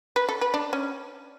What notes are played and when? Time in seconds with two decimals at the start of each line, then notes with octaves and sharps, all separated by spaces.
0.16 B4
0.29 A4
0.41 B4
0.54 D4
0.73 C#4